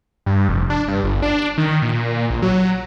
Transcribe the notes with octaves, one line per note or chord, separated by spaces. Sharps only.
G2
F1
D4
G2
G1
D4
D#3
A#2
A#1
F#3